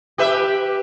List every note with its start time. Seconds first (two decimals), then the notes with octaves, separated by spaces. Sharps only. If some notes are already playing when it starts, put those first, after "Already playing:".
0.18 G4 B4 E5